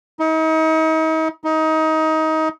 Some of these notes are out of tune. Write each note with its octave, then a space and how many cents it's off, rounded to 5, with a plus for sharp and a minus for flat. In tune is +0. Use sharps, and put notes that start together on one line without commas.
D#4 +40
D#4 +25